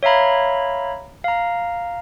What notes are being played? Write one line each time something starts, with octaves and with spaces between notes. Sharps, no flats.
C#5 E5 F5 A#5 B5
F5 A#5